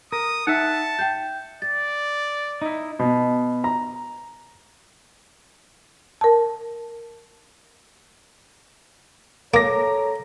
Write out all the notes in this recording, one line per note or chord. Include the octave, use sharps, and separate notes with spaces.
A#4 D#6
D#4 E5 F#5 A5
G5 G6
D5 A6
D#4 E4
B2
A#5
A#4 A5
A#3 A4 C#5 A#5 D6 A#6